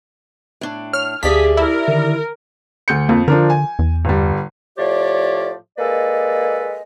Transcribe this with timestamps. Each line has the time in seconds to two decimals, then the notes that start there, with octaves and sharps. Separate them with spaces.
0.61 A2 D4
0.93 C#5 F6
1.23 D2 G4 G#4 D5 E5 F5 A5 B6
1.57 E4 A#4
1.88 D3 D#3
2.88 D2 G6 C#7
3.09 F2 A#3
3.28 D3 F3 D4 A#4
3.50 G#5
3.79 E2
4.05 G1 G3
4.78 A2 F3 G4 C#5 D5
5.78 G#3 A#3 A4 B4 D5 D#5